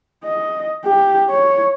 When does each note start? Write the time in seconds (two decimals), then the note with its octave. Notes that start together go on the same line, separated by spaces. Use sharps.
0.24 D#5
0.86 G4
1.30 C#5